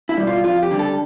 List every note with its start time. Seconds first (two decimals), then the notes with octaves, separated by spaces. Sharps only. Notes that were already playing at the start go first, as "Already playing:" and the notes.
0.09 E4
0.17 B2 G3
0.27 F4
0.44 F2 F4
0.62 G4
0.71 D3 G3
0.79 A4